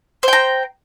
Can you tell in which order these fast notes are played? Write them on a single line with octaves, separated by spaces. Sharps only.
C5 G5 A#5